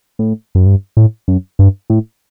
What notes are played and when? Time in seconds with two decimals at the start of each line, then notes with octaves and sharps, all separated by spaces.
0.19 A2
0.55 F#2
0.66 G2
0.97 A2
1.28 F#2
1.59 G2
1.90 A2